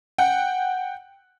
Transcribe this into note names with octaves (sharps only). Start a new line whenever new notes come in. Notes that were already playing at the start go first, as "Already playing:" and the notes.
F#5 G5